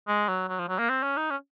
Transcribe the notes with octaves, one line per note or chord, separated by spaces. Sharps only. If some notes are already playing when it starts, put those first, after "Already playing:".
G#3
F#3
F#3
F3
F#3
A#3
C4
C#4
D#4
C#4